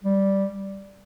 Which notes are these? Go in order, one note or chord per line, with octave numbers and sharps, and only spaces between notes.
G3